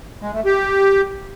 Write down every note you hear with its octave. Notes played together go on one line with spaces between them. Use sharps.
G#3
A3
G4